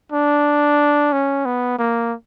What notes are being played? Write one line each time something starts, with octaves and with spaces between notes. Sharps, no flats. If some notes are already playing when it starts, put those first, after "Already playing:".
D4
C#4
B3
A#3